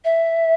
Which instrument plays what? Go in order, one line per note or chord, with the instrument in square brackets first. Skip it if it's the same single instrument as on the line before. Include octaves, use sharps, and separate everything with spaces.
[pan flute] E5